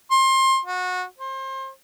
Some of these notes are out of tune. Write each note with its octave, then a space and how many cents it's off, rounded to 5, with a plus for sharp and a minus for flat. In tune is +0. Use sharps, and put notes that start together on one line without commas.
C6 +25
F#4 -25
C5 +30